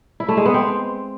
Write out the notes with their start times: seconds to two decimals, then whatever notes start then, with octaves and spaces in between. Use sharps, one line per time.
0.20 E4
0.29 A3
0.37 G#3
0.46 B3
0.54 C4